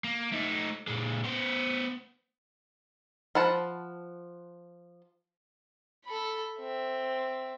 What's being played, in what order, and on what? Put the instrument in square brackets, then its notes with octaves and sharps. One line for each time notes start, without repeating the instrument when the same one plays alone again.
[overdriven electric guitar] A#3
A3 D#4
A#2 G#3
B3 C5
[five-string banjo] F3 B4 F#5 A5
[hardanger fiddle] A4 B5
C4 E5